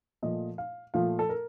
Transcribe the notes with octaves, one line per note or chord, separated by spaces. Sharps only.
A#2 F3 A3 D#5
F5
A#2 F3 A3 F5
A4
A#4